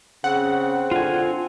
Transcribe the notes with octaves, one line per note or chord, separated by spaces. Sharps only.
C#3 C4 F#5
D3 F4 G#5